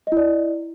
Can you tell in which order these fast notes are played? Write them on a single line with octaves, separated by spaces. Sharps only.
D#5 E4 D5